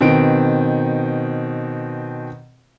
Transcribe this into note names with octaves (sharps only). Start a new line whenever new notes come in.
B2 D#3 C4 D7